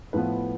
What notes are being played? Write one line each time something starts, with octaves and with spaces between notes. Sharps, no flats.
A2 F3 B3 B4